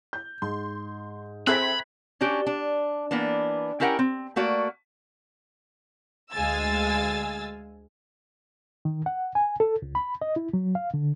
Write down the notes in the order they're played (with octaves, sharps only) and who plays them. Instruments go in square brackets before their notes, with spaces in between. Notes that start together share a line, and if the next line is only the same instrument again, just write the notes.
[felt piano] G6
[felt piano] G#2 [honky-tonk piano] C6
[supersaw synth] C4 [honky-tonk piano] G#4 A4 E5 [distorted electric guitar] B5 [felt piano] F#6 G#6 B6
[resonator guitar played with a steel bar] C#4 D4 F#4 G4
D4
E3 A#3 B3 D4
C#4 E4 G4 A#4 F#5 G5
C4
A3 A#3 F#4 D5
[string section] D2 G#3 F5 G#5 E6 A6
[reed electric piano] D#3
F#5
G#5
A4
C#2
B5
D#5
E4
F#3
F5
D3